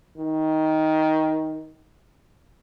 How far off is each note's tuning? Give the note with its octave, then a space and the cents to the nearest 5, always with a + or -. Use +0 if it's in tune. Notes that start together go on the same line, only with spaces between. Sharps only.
D#3 +15